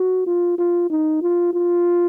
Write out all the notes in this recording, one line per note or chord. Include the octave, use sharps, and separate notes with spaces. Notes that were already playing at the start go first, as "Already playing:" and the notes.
Already playing: F#4
F4
F4
D#4
F4
F4